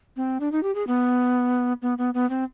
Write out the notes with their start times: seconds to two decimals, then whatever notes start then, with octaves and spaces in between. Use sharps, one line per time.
0.17 C4
0.40 D4
0.52 D#4
0.63 G4
0.75 G#4
0.87 B3
1.82 B3
1.98 B3
2.14 B3
2.30 C4